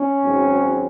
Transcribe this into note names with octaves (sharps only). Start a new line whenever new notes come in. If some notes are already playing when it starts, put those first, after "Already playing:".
Already playing: C#4
G#1 G#2 F#3 C4